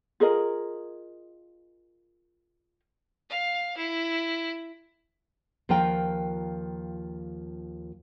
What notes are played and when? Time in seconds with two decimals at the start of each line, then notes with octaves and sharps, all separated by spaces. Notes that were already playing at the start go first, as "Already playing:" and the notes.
0.20 F4 G#4 A#4 D#5
3.30 F5
3.77 E4
5.69 D#2 F3 F4 A#4 F5 G5